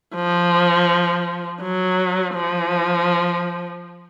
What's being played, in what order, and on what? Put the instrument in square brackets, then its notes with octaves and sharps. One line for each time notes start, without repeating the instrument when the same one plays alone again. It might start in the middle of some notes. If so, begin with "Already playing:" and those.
[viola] F3
F#3
F3